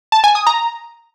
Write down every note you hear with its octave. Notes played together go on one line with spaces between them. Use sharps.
A5
G#5
D#6
A#5